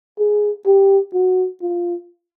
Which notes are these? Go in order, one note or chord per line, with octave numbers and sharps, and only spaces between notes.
G#4
G4
F#4
F4